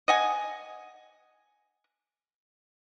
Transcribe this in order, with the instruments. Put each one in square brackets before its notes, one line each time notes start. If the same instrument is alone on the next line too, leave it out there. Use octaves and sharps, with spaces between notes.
[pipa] D#5 F#5 G#5